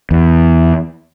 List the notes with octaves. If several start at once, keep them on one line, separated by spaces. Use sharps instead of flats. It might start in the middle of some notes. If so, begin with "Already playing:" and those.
E2